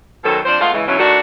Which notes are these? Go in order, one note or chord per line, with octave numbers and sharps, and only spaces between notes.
F#2 B2 D#3 F#3 A4 C5
F3 C4 D4 C5
G#3 A3 B3 F4 F5
C#3 E3 G#3
B2 D3 E3 F#3 C#4
D#3 A3 D4 F#4